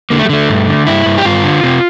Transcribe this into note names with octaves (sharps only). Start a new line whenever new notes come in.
D3 A#3
A3
G3
D3 A3
G2
D3
G2 E4
G2
G4
G2 F4
D3
C3